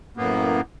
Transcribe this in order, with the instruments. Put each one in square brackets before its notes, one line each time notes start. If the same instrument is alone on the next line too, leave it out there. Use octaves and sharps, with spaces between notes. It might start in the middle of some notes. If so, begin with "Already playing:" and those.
[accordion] F#2 A2 A#3 B3